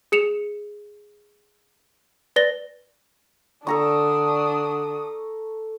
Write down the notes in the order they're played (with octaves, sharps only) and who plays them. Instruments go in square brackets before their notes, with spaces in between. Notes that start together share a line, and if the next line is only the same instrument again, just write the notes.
[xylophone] G#4 C#7 E7 F7
B4 D5 A6 A#6 G7
[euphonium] D3 [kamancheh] D4 D#6 [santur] A4 A#5 C#6